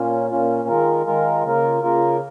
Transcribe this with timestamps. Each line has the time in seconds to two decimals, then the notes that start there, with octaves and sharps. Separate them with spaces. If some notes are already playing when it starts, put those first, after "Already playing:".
Already playing: A#2 A#3 C#4 F4
0.30 A#2 A#3 C#4 F4
0.68 D#3 G#3 F4 A#4
1.06 D#3 G#3 F4 A#4
1.44 C#3 A#3 F4 A#4
1.82 C#3 A#3 F4 A#4